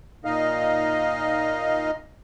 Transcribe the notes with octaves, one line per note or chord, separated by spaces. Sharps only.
A#2 D#4 D#5 F5